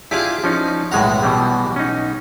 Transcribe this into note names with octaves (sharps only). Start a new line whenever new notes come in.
D4 E4 F4 G4 G#4
F3 C#4 D#4
B1 A2 G#3 F#4 F#5 A#5
B2 E3 G3
C#4 D#4